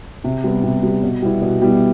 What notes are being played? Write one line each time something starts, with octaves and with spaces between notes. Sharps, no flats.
C3
G3 B3
C3
G3 B3
B2
G3 B3 E4
B2
G3 B3 E4